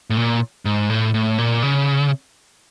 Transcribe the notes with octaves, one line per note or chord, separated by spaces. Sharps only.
A2
A#2
G#2
A2
A2
A#2
C#3